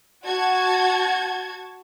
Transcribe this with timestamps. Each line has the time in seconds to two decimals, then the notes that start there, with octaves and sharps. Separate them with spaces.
0.24 F#4 A5 G#6